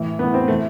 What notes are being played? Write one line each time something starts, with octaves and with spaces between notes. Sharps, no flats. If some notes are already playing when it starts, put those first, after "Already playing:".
Already playing: A2 E3
A2 E3 B3
C4
E3 A3